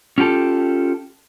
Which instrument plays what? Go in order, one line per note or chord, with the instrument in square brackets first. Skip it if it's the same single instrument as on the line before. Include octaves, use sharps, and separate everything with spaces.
[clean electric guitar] C#4 F4 G4 A4